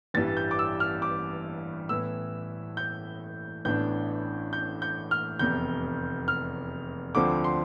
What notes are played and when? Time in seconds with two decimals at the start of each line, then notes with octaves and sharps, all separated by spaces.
0.14 A1 G2 E3 G3 A6
0.37 G6
0.51 D6
0.59 E6
0.80 F6
1.02 D6
1.89 A2 E3 B3 E4 E6
2.77 G6
3.65 A1 A2 E3 B3 D4 G6
4.53 G6
4.82 G6
5.11 F6
5.39 F1 E2 C3 G6
6.28 F6
7.15 D2 D3 F3 C4 D6
7.44 C6